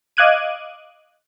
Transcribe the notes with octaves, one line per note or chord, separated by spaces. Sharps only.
D#5 F5 D6 F#6 G#6 D#7